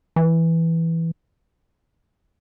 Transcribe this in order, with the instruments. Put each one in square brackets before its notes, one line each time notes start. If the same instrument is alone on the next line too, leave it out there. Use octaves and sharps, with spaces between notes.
[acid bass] E3